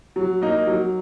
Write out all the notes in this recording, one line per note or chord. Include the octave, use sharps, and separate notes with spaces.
F#3
A#3 D#4
F#3